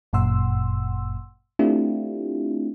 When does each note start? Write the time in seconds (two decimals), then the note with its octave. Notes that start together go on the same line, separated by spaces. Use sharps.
0.13 G1 F#2 A#2 F#5 C6 E6
1.59 A3 C4 D4 E4 F4 G4